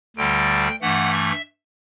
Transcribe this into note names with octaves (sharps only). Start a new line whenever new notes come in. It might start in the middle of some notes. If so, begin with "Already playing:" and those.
D2 D3 G3 G5
G2 E3 A3 F#5
E5